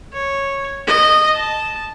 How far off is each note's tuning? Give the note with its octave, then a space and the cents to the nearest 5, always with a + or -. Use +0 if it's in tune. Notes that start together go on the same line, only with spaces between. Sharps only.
C#5 -10
D#5 -15
A5 -10